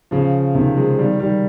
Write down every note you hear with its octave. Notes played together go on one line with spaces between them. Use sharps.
C#3 F3
C3 D#3
F3 G#3
D#3 G3
D#3 G3